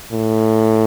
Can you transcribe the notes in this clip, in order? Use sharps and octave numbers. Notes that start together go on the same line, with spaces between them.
A2